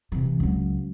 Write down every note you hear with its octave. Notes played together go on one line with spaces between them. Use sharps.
C3 E3
C#2 F#3